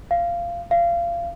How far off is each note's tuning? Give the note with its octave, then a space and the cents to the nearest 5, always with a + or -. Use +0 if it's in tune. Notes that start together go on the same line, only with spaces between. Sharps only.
F5 -15
F5 -25